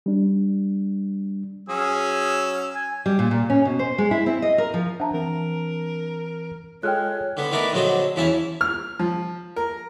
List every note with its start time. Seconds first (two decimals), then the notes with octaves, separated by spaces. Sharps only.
0.06 G3 D4
1.69 F#3 C#4 G#4 E6
2.75 G#5
3.06 G3
3.19 A#2
3.31 A#2
3.50 C#4
3.65 B2
3.79 C5
3.98 G#3
4.11 E4
4.26 C4
4.42 D#5
4.58 A#4
4.74 F3
5.00 D4 C5 E5 F#5 A5 A#5
5.14 E3 C4 A#4
6.83 G#3 F4 A4 C#5 G5 F6 F#6
7.37 D3 B3
7.52 D#3 A3 B3 A#4 B4 D5
7.73 A#1 D3 F#3 C4 A4 D#5
8.16 E2 E3 C#4 E4 A5
8.61 F6
8.99 F3
9.56 A#4